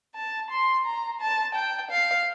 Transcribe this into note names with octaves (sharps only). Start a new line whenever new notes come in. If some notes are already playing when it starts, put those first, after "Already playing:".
A5
C6
A#5
A5
G5
F5